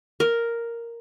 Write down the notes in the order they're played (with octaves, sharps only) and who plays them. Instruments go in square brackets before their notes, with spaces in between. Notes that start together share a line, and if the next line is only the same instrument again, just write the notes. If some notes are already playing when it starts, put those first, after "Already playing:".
[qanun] A#4